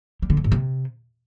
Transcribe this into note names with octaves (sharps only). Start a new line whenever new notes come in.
G3
D3
G2
G#2
C3